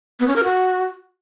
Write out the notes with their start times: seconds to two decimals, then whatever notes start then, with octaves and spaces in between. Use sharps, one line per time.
0.20 B3
0.28 C#4
0.36 A#4
0.44 F#4